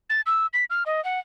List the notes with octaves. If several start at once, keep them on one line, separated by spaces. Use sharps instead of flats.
A6
E6
B6
F6
D#5
F#5